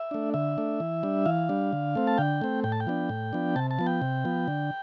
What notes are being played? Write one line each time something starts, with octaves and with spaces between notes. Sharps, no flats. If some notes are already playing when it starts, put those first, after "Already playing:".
Already playing: E5
A3 D4
D3 E5
A3 D4
E3
G3 D4
E3 F5
G3 D4
D3
A3 C4
A5
D3 G5
A3 C4
A2 G5
A5
G5
F3 B3 D4
A2
F3 B3 D4
C3 A5
A5
F3 B3
G5
C3
F3 B3
D3